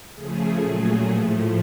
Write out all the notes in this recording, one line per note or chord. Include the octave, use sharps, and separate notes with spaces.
C#3 F3 A3 G#4
A#2 F#3 A3
A2 F3 A3